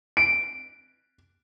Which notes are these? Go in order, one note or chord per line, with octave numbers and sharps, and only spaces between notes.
D7